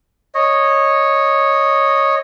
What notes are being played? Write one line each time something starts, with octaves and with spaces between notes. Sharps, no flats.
C#5 D#5